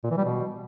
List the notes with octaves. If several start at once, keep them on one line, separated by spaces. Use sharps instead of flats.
A#2
E3
G3
B2